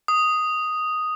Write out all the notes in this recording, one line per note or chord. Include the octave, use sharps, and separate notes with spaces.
D#6